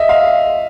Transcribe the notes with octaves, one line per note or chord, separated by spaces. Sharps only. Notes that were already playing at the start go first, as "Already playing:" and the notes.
Already playing: D#5 E5
F5